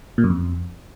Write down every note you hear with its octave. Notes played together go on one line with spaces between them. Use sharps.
A#2
F#2
F2